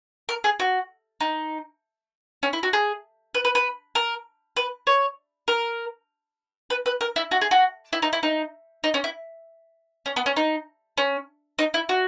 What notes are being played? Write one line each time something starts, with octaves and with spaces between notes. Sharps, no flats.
A#4
G#4
F#4
D#4
C#4
E4
F#4
G#4
B4
B4
B4
A#4
B4
C#5
A#4
B4
B4
A#4
E4
F#4
G#4
F#4
E4
D#4
E4
D#4
D#4
C#4
E4
C#4
B3
C#4
D#4
C#4
D#4
E4
F#4